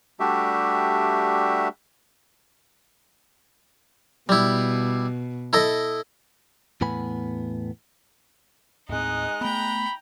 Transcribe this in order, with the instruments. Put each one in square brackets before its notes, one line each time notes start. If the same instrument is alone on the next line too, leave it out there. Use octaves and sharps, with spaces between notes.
[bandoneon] G3 A3 D4 F#4 G4 E5
[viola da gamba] B2 [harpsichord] G3 E4
[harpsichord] E4 A4 D#5
[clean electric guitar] E2 A2 B3 G#5 B5
[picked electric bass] D#2 A2 C4 [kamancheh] G#3 F#6 [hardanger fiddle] D#4
[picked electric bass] A3 B3 [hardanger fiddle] G5 A#5 [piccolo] B5